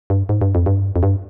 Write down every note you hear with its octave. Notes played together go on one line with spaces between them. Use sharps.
G2
G#2
G2
F2
G2
F2
G2